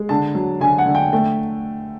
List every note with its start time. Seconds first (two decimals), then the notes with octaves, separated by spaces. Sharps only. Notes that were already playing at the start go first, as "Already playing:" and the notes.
Already playing: G#3
0.09 D3 A5
0.35 F#3
0.60 D3 G#5
0.78 F#5
0.86 D3
0.95 G5
1.13 A3 G5